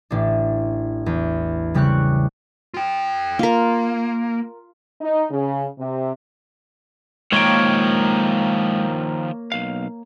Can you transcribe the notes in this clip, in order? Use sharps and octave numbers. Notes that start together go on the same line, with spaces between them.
A1 D4
E2
C#3 G3 C4 G4 C#6 F#6
F4 G5
A#3 F4 A#4
D#4
C#3
C3
D#3 F3 G#3 A#3 C#5 G5
B1 F5